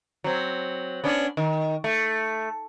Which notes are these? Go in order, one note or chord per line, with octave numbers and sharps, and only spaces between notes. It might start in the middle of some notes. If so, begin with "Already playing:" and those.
F#3 C4
B3 C#4 D4
D#3
A3